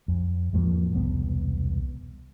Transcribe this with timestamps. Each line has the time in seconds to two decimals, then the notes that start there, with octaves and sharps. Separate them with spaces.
0.08 F2
0.53 E2 G#2 F3 A#3
0.93 E1 C2 B3